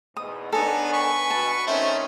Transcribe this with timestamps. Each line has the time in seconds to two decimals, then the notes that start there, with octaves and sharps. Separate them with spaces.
0.17 E2 G#2 B2 D#6
0.52 D#3 B3 D4 D#4 A4 C#5 G#5
0.94 B4 C#6
1.30 B2 A5
1.67 D#3 A3 C4 C#4 C5 E5